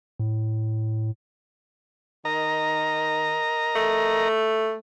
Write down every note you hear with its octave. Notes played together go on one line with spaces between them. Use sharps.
A2
D#3 A#4 D#5 A#5
A3